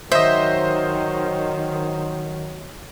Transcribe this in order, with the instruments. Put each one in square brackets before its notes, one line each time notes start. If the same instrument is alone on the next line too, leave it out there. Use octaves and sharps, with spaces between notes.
[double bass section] D#3 [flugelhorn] F#3 [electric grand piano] C5 D#5 [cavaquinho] E5